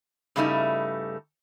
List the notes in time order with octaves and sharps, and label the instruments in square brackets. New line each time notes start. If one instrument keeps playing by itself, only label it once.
[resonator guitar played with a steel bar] G2 C#3 G3 A3 D#4 E4